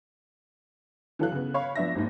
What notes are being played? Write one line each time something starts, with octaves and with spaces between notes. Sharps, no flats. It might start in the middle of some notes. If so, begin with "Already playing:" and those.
E3 F#3 A4 F5 F#6
C#3 B3
C#5 F5 B5 C#6
F3 B3 D4 E5 A#6
G#1 D#2